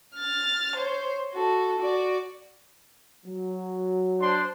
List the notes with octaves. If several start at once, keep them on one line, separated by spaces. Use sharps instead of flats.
F6 A6
C5 C#5
F#4 A4
F#4 D5
F#3
D4 C5 C6